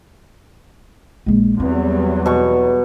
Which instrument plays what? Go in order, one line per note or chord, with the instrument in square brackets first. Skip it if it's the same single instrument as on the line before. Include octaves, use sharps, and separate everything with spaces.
[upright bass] A#1 G#3
[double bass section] E2 F#3 G3 [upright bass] C4
[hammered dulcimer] B2 C#6